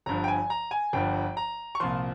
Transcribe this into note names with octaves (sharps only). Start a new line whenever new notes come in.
G1 G2 F3 A#5
G5
G#5
A#5
G#5
G1 G2 F3 G5
A#5
C#6
C2 A#2 F3 C6